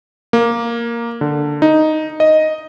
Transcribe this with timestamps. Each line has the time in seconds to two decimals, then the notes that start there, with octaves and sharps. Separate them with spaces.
0.33 A#3
1.21 D3
1.62 D#4
2.20 D#5